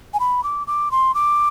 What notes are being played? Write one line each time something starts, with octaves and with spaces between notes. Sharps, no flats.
G#5
B5
D6
D6
C6
D6